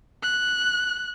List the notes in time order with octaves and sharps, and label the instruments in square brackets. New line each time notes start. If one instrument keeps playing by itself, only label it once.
[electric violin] F#6